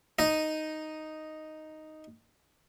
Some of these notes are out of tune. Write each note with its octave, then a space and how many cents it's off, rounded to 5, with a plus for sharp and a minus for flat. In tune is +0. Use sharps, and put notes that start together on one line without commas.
D#4 +0 D#5 +0